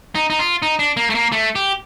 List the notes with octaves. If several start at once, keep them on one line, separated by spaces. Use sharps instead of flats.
D#4
D#4
F4
D#4
D4
A#3
A3
A#3
A3
G4